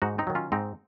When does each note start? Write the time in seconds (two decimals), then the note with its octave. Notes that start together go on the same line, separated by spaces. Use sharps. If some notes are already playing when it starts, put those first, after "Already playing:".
0.02 G#2 D#4 F#4
0.18 C4 D#4
0.27 D#3 F#3
0.35 C#4 F4
0.52 G#2 C4 D#4